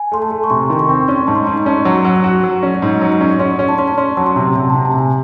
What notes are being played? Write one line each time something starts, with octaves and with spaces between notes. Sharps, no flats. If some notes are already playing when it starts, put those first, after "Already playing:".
Already playing: G#5
A3 C6
A5
A3
C#6
C3 C6
D#3
C#6
C4
C#4 C#6
C6
G#2 A5
C6
G#2
C#4 A5
F#3
F#3
F#4
F#3
C#4
G#2
F#3
C#4
C#4 C6
C#4
A5
C#4 C6
A5
C#4 C6
F#3 A5
C6
C3
C3
A5
C3
A5
C3 G#5